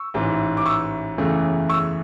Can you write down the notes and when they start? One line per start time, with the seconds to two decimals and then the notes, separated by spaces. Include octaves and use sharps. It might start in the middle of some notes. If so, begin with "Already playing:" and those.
Already playing: C#6 E6
0.14 A1 G#2 E3
0.57 D6
0.66 C#6 E6
1.18 F#1 E2 C#3 E3 A3
1.69 C#6 E6